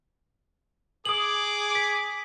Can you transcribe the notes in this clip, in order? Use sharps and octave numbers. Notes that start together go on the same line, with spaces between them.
G#4 D6 D#6 F#7
B6